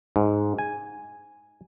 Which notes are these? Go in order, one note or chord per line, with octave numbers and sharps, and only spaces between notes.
G#2
G#5